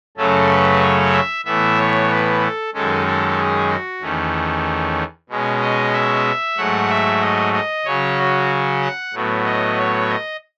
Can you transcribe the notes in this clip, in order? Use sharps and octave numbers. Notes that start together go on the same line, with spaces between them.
F#2 C#3 F#3 A3 C#4 A4
B4
C#5
E5
A2 E3 B3 E5
C#5
B4
A4
F#2 D#3 G#3 C#4 A4
A4
G#4
F#4
E2 D#3 A3 C#4
B2 G#3 C#4
D#5
E5
G#2 F#3 A3 F#5
E5
D#5
D#5
C#3 F#3 C#4 C#5
F#4
F#5
A2 F#3 B3
D#5
C#5
D#5